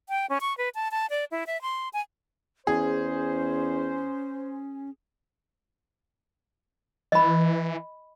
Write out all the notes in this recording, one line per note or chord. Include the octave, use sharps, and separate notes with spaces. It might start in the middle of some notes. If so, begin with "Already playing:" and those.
G5
C#4
C#6
B4
A5
A5
D5
E4
E5
C6
G#5
E2 C#4 G#4 C5
E3 D#5 B5